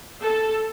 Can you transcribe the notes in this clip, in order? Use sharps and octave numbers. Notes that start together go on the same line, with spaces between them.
A4